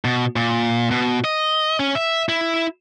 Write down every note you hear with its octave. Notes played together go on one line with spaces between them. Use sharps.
B2
A#2
B2
D#5
C#4
E5
E4